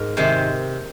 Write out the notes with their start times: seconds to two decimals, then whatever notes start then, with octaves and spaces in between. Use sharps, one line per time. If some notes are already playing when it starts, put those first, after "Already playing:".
Already playing: G#2 A#4
0.17 C3 D#3 G#3 C5